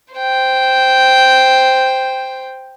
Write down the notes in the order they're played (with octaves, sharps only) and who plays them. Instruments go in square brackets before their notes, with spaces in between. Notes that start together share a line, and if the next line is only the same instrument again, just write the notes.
[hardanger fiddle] C5 G5